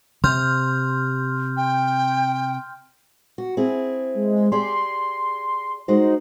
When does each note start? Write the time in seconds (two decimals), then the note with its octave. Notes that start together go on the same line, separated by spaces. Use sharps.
0.24 C3 C6 F6 G6
1.57 G5
3.38 F#4
3.57 C4 E4 G#4
4.15 G#3
4.52 G4 G#4 D5 C6
5.88 G#3 D#4 F#4 C5